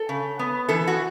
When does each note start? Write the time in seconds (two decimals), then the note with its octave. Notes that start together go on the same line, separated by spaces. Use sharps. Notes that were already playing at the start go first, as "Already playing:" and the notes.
Already playing: A4
0.09 C#3
0.39 B3
0.69 E3 A4
0.87 F#4